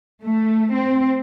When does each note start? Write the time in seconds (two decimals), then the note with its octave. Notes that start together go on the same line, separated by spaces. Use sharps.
0.24 A3
0.74 C4